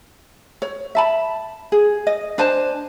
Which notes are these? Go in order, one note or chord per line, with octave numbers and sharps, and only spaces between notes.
C#5
E5 A5 B5
G#4
D#5
D4 C5 G#5 A5